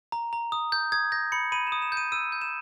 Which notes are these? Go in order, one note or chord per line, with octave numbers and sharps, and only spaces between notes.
A#5
A#5
D#6
G6
D#6 G#6
G6 A#6
B5 C#7
B5 D#7
E7
D#6
E7
G6
D#7
E6 D#7
G6
E7